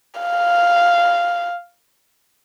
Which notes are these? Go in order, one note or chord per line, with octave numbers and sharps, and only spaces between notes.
F5